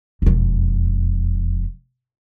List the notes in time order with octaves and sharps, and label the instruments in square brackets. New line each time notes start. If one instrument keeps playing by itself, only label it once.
[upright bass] E1 F2